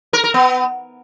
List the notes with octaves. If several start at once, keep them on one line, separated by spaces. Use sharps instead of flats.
A#4
A#4
B3